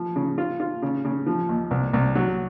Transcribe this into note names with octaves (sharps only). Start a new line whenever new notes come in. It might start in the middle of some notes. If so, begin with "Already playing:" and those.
Already playing: F3
C#3
F4
F4
C#3
C#3
F3
D#2
C2
C2
F#3